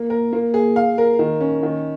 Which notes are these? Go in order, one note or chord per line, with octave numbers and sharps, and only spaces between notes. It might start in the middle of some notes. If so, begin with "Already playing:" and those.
Already playing: A#3
A#4
A#3
G#4
F5
A#4
D#3
C#4
D#3